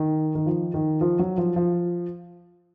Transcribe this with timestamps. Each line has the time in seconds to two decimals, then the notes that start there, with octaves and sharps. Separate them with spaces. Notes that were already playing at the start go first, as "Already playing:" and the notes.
Already playing: D#3
0.35 D#3
0.46 F3
0.74 D#3
1.01 F3
1.19 F#3
1.38 F3
1.56 F3